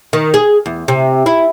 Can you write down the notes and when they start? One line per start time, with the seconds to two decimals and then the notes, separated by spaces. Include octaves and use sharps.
0.13 D#3
0.34 G#4
0.66 E2
0.88 C3
1.26 E4